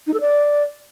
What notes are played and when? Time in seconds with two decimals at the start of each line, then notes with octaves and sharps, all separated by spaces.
0.07 D#4
0.14 A4
0.20 D5